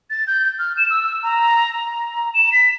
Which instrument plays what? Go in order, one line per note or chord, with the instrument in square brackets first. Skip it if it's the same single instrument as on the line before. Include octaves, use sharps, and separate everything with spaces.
[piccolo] A6
G6
F6
E7
E6
A#5
A#5
E7
B6